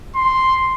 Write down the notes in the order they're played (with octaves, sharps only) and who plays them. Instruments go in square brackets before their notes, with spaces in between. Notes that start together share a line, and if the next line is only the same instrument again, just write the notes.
[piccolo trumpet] C6